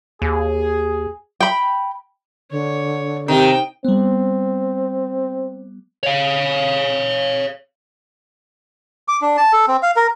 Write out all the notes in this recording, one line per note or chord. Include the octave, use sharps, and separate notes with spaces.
D#2 G#4
G5 B5
D3 C#5
C3 D#3 G5
G3 B3 C4
C#5 F5
D6
D4
A5
A4
C4
F5
A#4